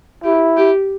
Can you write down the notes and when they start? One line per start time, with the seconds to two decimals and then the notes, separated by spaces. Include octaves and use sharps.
0.24 E4 G4
0.57 G4